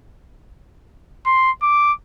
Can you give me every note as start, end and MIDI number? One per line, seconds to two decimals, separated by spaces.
1.26 1.51 84
1.62 1.92 86